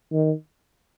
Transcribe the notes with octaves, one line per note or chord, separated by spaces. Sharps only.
D#3